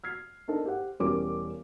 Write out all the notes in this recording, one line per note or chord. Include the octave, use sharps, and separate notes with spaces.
F6 G#6 C7
D4 D#4 A4 A#4 C5
G4 C5 F#5
E1 G3 C#4 A#4 C5 D6